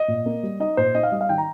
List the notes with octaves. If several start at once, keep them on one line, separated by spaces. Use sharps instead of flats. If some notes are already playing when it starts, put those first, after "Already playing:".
Already playing: D#5
A#2
A#3
G3
D#4 D#5
A#2 C5
D#4 D#5
F5
G3 D#5
F5
D#3 G5
A#5